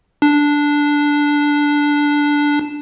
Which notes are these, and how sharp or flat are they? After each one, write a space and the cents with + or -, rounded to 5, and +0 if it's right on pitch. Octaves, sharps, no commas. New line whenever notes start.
D4 -5